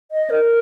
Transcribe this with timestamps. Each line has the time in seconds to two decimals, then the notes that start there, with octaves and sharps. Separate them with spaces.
0.11 D#5
0.30 A#4